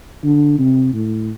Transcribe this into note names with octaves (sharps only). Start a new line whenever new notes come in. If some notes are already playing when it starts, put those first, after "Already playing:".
D3
C3
A2